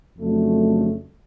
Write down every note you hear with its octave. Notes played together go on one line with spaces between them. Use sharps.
F2 C#3 F#3 A3 D4